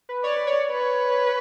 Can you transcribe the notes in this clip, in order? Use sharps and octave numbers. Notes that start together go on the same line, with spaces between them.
B4
C#5 D5
B4
C#5
B4